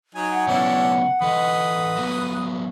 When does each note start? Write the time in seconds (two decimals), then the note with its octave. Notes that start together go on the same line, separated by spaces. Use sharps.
0.15 F#3 D#4 G#5
0.31 F#5
0.47 C#3 F#3 B3 C#4 D4 E4
1.22 E3 A4 B4 D#5 D#6
1.97 F#3 A#3 B3